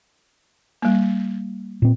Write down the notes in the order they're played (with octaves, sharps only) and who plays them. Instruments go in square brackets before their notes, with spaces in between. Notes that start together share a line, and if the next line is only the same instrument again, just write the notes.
[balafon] G3 A#3
[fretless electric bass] A#2 C4